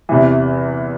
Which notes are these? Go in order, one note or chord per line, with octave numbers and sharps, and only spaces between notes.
E2 C3 E3